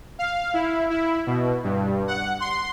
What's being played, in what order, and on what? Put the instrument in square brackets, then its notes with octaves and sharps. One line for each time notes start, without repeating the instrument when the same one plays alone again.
[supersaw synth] F5
E4
E4
B2
G2
F#5
C6